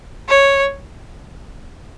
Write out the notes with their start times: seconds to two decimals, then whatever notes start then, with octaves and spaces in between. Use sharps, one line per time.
0.28 C#5